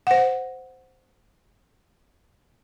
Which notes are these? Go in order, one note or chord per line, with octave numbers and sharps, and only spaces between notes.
C5 F#5